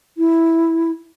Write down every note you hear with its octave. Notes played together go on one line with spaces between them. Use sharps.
E4